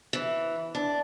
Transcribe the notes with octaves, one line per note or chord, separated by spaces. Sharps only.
E3
D4